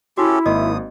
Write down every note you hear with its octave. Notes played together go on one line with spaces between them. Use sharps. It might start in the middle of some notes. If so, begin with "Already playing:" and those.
C#4 E4 F#4 G4 A4
G#1 A#3 D#5 C6 D#6